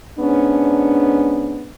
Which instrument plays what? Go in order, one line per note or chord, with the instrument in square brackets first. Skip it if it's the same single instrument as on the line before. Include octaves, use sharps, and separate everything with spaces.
[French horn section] G#2 B3 C#4 D4